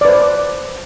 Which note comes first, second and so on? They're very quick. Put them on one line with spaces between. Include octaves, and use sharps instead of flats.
D5 B4 C5